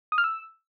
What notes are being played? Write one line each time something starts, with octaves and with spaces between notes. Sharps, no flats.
D#6
F6
E6